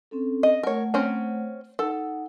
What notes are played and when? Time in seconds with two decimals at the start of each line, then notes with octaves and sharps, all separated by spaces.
0.11 C4 C#4 A4
0.43 D#5
0.63 A3 A#4 C#5 F#5
0.94 C4 C#4 A#5
1.79 D#4 A4 F#5